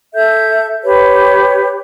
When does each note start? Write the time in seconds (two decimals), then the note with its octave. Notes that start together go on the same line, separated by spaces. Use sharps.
0.14 A4 E5 G6
0.84 G4 B4 C#5